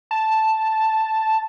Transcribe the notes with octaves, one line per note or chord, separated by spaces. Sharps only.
A5